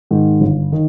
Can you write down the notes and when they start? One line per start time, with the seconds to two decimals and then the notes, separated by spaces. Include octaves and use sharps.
0.11 G#2 D#3
0.41 G1
0.72 D#3